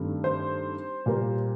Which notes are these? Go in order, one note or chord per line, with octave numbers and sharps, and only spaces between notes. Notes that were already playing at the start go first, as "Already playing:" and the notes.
Already playing: G2 D#3 A3 C4
C5
A#2 G3 A#3